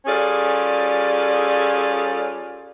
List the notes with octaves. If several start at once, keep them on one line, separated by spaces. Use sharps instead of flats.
G3 C#4 F4 G#4 A4 D5